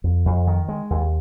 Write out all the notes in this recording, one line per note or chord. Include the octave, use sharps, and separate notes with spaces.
F2
F2
D#3
G#3
D#2